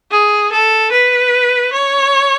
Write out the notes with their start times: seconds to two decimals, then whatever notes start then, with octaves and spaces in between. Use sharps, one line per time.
0.11 G#4
0.52 A4
0.92 B4
1.73 C#5